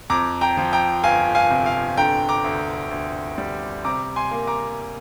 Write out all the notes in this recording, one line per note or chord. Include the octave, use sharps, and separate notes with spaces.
F2 A#5 D6
G5 A#5
F3
G5 A#5
G1 F5 G#5
F5 G#5
C3
F5
D3 G5 A#5
A#5 D6
D2
D2
G3
C3 A#5 D6
G#5 C6
A#3
A#5 D6